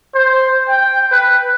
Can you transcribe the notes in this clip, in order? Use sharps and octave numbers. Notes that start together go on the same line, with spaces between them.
C5
G5
B4